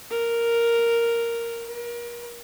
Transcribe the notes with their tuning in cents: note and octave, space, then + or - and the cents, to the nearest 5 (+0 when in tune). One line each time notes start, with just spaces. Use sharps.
A#4 +0
A#4 +35